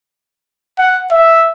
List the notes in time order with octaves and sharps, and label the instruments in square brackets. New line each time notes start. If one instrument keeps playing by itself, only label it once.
[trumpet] F#5
E5